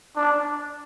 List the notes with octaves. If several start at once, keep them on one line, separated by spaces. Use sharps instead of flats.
D4